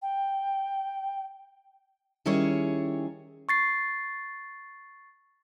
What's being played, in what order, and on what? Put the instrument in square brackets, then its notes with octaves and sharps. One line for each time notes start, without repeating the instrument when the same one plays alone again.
[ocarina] G5
[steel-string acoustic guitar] D#3 G3 C#4 E4 G#4 C#5
[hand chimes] C#6 A6 C7